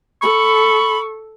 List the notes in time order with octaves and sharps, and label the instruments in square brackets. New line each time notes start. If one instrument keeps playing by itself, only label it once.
[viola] A4 [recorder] B5 [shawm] C#6